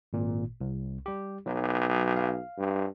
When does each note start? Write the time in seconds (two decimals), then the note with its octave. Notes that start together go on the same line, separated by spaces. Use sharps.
0.13 G#1 A#2
0.61 C2
1.06 G3 G4
1.47 B1 F#3
2.16 F5
2.58 G2